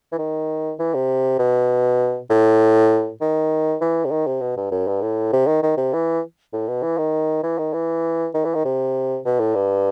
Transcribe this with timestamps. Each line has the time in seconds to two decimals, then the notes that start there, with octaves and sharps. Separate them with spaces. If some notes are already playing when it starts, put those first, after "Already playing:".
0.12 E3
0.18 D#3
0.79 E3
0.94 C3
1.39 B2
2.30 A2
3.21 D#3
3.81 E3
4.05 C3
4.11 D#3
4.27 C3
4.41 B2
4.57 G2
4.72 F#2
4.87 G2
5.02 A2
5.33 C3
5.47 D#3
5.63 D#3
5.77 C3
5.93 E3
6.53 A2
6.68 B2
6.83 E3
6.98 D#3
7.43 E3
7.58 D#3
7.73 E3
8.34 D#3
8.45 E3
8.54 D#3
8.65 C3
9.25 B2
9.40 A2
9.55 G2